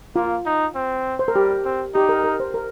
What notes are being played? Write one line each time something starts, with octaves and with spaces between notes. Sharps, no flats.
A#3 F4
D#4
C4
C5
A#4
G3 G4
C4
D#4 G4
A#4
A#4
C5
A#4